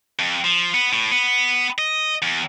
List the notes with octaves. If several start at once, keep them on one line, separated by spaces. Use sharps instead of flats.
F2
F3
B3
A2
B3
D#5
E2